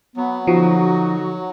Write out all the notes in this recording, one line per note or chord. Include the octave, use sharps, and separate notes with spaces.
F#3 B3
D3 F3 D#4 F#4